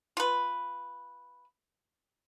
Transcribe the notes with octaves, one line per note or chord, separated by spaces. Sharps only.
F4 B4